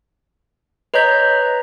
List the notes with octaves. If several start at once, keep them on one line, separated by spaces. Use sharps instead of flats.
B4 C#5 D#5 A#5 G6 B6